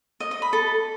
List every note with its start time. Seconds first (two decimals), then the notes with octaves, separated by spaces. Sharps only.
0.20 D#5
0.31 D#5
0.42 B5
0.53 A4